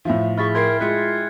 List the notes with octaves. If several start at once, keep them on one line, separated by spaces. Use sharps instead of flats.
A2 F3 E5
E4 G#4 C#6 F6 A6 B6
A#4 G5 C6 G#6 C7
G#3 F4 F#6 B6 C#7